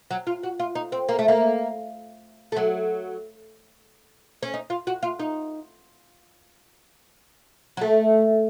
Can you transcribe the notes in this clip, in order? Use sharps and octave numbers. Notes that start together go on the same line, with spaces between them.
F#3
F4
F#4
F4
D#4
C4
A#3
A3
A#3
A3
F#3
C#4
D#4
F4
F#4
F4
D#4
F#3
A3